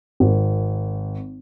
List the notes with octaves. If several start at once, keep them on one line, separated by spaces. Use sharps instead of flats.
G#1